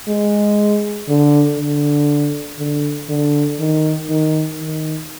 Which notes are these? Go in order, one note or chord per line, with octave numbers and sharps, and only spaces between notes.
G#3
D3
D3
D3
D3
D#3
D#3
D#3